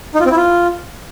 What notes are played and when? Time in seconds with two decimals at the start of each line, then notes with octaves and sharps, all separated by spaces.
0.15 D#4
0.20 F4
0.26 C4
0.31 E4
0.37 F4